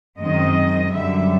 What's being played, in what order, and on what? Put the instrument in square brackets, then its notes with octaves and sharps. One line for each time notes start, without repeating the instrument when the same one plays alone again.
[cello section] F#2 D#3 G#3 C4 D#5
F#2 D3 G3 E5